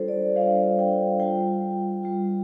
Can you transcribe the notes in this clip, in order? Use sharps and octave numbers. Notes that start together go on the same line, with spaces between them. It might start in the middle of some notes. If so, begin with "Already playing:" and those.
Already playing: G3 D4 F4 A4 C5
D5
G3 D4 F4 F5
G5
G3 F4 G5
G3 F4